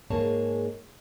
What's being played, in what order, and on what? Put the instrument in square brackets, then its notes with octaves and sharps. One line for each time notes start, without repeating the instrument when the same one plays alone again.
[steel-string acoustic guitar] G#2 G#3 A#3 G#4 C#5 A5